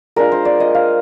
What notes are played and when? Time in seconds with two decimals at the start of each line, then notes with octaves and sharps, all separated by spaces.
0.16 G#3 D4 F4 A#4
0.32 C5
0.45 D5
0.60 D#5
0.75 F5